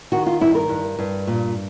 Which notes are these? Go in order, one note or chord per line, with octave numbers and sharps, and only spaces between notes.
D#3 F#4
F4
G2 E4
A#4
G2
G2
A#2